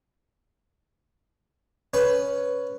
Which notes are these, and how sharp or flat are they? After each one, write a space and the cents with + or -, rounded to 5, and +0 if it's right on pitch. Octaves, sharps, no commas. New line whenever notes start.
C#4 +10 B4 +0